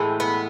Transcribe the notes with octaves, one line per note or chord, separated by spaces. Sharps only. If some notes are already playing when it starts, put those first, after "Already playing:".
Already playing: A2 E3 G#3
B3